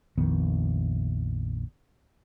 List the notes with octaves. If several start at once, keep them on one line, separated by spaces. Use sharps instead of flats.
A#1 F2 D#3 B3